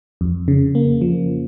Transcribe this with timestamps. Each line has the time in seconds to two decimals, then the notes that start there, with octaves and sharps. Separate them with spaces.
0.21 F2
0.48 C#3
0.75 A#3
1.01 F3